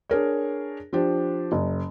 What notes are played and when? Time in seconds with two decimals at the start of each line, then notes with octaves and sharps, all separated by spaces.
0.10 D4 G#4 A#4 C#5
0.93 F3 D4 G4 C5
1.52 F#1